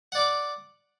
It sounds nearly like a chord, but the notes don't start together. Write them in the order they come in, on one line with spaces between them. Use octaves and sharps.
F#5 D5 D6